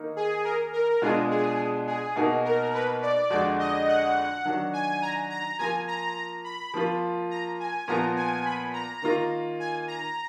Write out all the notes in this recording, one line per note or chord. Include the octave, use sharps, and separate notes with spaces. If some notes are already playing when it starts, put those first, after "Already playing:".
Already playing: D#3 A#3 D#4
G#4
A#4
A#4
B2 G#3 D4 F4 G#4
G#4
G#4
B2 A#3 D#4 F#4
A#4
B4
D5
F2 D3 G#3 D4 F#4 D5
D#5
F#5
D#3 F#3 D4 F#4
G#5
A#5
A#5
F3 A#3 F4 G#5
A#5
A#5
B5
F3 A#3 F4
A#5
G#5
A#2 F3 B3 F4 A#5
G#5
B5
A#5
D#3 A#3 F4 A#5
G#5
A#5